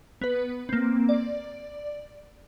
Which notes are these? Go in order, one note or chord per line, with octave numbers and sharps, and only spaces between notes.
B3 B4
A#3 C4
D5